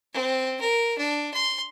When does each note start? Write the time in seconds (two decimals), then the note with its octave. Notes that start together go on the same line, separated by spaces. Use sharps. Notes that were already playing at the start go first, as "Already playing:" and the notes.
0.13 C4
0.61 A#4
0.98 D4
1.34 C6